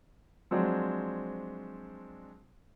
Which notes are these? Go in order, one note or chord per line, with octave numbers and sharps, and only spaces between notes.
F3 F#3 G#3 C4 D4